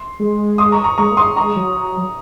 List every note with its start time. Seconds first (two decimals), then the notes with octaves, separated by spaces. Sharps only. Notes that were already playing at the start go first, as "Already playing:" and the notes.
Already playing: C6
0.20 G#3
0.58 C6 D#6
0.72 A#5 C#6
0.84 A#5 C#6
0.98 G#3 A#5 C#6
1.11 A#3
1.17 G#3 C6 D#6
1.36 G#3 A#5 C#6
1.56 F#3